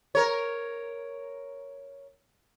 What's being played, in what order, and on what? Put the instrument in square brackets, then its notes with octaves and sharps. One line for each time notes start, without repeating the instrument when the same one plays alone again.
[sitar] A#4 C#5